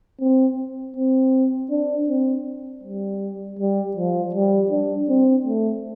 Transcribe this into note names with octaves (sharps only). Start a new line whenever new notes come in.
C4
C4
D4
C4
G3
G3
F3
G3
D4
C4
A3